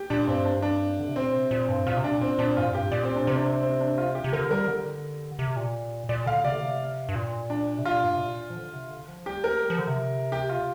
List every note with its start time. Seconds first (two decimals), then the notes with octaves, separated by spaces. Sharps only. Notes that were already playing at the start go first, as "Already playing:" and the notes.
Already playing: G4
0.10 A#2 D4
0.27 G2 C4
0.45 D4
0.62 D4
0.99 D3
1.08 C3
1.15 A#2 C4
1.34 C3
1.51 A#2
1.69 G2
1.86 A#2 F4
1.97 C3
2.04 A#2 D4
2.21 C4
2.39 A#2 D4
2.57 G2 F4
2.64 A#2
2.73 G2 G4
2.92 A#2 D5
3.03 C4
3.16 D4
3.27 C3 C4
3.36 D4
3.45 C4
3.62 C4
3.80 D4
3.98 F4
4.15 G4
4.24 C3
4.33 D3 A#4
4.50 G3 A#4
4.68 D3
5.39 C3
5.56 A#2
6.09 A#2 D5
6.26 D3 F5
6.44 C3 D5
6.52 D3
6.60 C3
7.09 G2
7.15 A#2
7.50 D4
7.78 C3
7.85 A#2 F4
8.03 G2
8.15 C3
8.21 A#2
8.50 F3
8.56 D3
8.73 C3
8.91 D3
9.08 F3
9.26 G3 G4
9.44 A#3 A#4
9.61 G3
9.70 F3
9.79 D3
9.88 C3
10.32 G4
10.49 F4